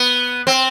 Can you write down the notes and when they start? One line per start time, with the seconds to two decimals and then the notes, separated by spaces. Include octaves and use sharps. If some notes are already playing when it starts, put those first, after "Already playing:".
Already playing: B3
0.47 C4